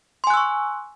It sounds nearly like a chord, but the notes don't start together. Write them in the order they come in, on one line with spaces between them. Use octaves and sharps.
C6 G#5 F#6 E6 C#6